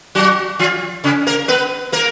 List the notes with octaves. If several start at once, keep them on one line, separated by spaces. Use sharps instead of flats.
F#3 F#4
F3 F4
C#3 C#4
A#3 A#4
B3 B4
A#3 A#4